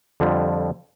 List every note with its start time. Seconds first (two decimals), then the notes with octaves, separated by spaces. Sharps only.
0.20 F2 D3 F3 G3